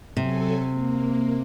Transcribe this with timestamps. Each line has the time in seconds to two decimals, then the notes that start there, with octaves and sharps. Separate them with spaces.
0.17 C3 F#3 A4 G#5
0.70 A#3